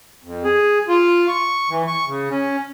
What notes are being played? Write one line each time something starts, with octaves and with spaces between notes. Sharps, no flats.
F2
G#4
F4
C#6
E3
C#6
C#3
C#4